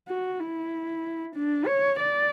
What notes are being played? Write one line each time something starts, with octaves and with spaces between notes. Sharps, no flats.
F#4
E4
D4
C#5
D5